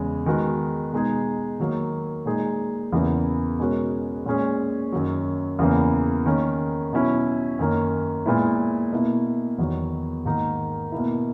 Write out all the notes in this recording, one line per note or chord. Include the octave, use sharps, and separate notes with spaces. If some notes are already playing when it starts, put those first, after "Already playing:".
Already playing: E2 C#3 G#3
D#3 G#3 B3 F#4
B2 G#3 D#4 G#4
D#3 F#3 A#3
A#2 G#3 D#4 G#4
E2 C#3 E3 A#3 E4
B2 G#3 C#4 F#4 A#4
A#2 G#3 C#4 G#4
F#2 D#3 F#3
E2 C#3 E3 A#3
D#3 A#3 C#4
B2 F#3 C#4 E4
F#2 D#3 A#3 C#4
A#2 G#3 B3 E4
B2 A#3 E4
E2 D#3 F#3
G#2 D#3 A#3 D#4
B2 A#3 E4